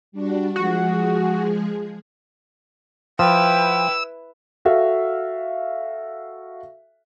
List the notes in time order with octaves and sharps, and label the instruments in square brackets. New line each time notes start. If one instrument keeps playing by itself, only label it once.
[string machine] G3 D4 F#4
[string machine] F3 G#3 G#4 [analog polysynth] F#4
[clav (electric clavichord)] F3 [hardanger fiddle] E4 B4 [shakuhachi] G5 [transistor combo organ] E6
[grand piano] F#4 A4 E5 F5